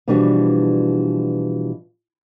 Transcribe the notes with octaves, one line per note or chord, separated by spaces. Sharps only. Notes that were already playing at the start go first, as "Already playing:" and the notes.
B2 E3 F3 G3 D4 F#4